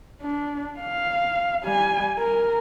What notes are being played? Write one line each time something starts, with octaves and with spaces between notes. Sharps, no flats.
D4
F5
G3 G#5
A#4